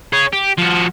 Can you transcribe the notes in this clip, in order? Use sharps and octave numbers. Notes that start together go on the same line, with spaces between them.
G#4 C#5
G4
F3 F#4